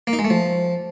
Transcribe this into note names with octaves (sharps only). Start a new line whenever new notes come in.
A#3
D#4
G#3
A3
F3